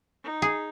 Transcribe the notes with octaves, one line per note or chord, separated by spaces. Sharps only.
D#4
G#4